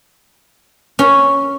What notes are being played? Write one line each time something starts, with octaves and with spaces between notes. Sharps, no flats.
C#4